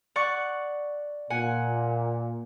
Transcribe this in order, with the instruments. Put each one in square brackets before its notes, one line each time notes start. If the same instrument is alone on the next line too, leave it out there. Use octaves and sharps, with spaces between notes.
[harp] D5 F#5 C#6
[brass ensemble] A#2 [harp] F#5 G#5